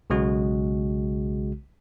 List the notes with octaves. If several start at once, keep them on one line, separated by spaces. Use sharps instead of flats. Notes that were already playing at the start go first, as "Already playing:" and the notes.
B1 C#3 G#3 F#4